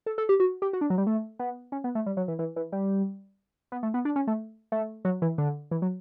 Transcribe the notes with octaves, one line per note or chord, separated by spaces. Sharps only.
A4
A4
G4
F#4
G4
F#4
D4
F#3
G3
A3
B3
C#4
B3
A3
G3
F#3
E3
E3
E3
G3
B3
A3
B3
D4
C#4
A3
A3
F#3
E3
D3
E3
F#3